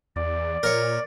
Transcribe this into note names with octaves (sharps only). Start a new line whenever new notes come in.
E2 D5
A#2 A#4 C#5